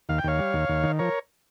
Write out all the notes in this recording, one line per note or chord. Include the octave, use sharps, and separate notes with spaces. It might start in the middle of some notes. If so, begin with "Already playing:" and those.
D#2 F5
G5
D#2 C#5 F5
G3
D#2
D#2
D#3
F3 A#4 C#5